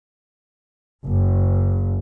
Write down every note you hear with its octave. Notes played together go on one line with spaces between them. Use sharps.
F#1